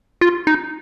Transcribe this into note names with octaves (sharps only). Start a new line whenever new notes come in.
F4
D#4